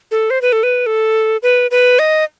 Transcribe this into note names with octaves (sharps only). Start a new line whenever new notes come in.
A4
C5
B4
A4
B4
A4
B4
B4
D#5